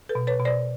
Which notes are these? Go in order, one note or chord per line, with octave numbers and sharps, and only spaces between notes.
A4 B4
B2
B4 C#5
B2
C5 D5